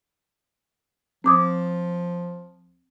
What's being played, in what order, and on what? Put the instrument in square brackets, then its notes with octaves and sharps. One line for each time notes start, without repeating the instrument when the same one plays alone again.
[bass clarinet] F3 [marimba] C4 D6 D#6